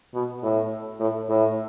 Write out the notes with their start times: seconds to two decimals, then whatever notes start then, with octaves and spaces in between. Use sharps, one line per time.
0.14 B2
0.43 A2
1.00 A2
1.29 A2